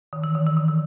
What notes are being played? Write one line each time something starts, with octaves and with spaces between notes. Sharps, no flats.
D#3
E3
D#3
E3
D#3
E3